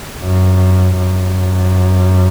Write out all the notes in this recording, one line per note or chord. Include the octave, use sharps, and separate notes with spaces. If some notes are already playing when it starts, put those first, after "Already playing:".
F#2
F#2